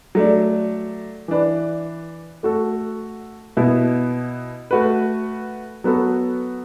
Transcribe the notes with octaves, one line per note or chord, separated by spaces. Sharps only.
F#3 A3 D4
E3 D4 B4
A3 F#4 A4
B2 B3 E4
A3 F#4 B4
F#3 B3 F#4 A4